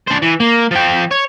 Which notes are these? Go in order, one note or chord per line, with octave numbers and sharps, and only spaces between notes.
D4 C5
E3
A#3
F3 G5
C#5